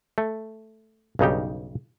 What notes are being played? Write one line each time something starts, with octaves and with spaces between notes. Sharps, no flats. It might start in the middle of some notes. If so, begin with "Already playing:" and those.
A3
B1 G2 C#3 D#4 G4